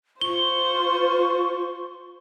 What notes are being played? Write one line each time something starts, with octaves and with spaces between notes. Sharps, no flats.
F4 C5 C#6 G7